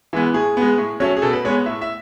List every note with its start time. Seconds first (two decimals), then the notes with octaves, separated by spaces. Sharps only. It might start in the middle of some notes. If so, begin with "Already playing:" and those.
0.13 E3 G#3 B3
0.34 A2 G#4
0.57 G#3 B3
0.78 A2
1.00 F#3 A3 C#4
1.17 G#4
1.22 B2 A4
1.33 B4
1.45 G#3 C#5
1.48 B3
1.66 A2 E5
1.81 E5